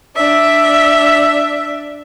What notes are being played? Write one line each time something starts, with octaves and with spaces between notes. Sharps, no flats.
D4 E5